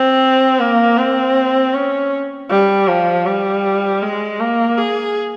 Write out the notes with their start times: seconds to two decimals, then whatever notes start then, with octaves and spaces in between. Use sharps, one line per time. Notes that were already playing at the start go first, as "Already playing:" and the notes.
Already playing: C4
0.60 A#3
0.98 C4
1.74 C#4
2.50 G3
2.89 F3
3.26 G3
4.03 G#3
4.41 A#3
4.78 G#4